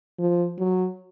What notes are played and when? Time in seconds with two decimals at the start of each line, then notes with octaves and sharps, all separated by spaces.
0.19 F3
0.59 F#3